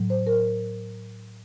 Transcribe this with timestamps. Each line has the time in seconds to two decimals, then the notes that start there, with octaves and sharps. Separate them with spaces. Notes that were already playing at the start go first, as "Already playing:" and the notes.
Already playing: A2 F#3
0.10 C5
0.27 A#4